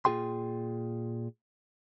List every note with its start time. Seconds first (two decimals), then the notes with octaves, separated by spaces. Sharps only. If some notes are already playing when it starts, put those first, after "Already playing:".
0.05 A#2 A#3 F4 G#4 G5 C6